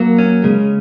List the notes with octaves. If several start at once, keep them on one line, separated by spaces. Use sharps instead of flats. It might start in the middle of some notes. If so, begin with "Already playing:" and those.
Already playing: F#3 A#3
C#4
C#3 G#3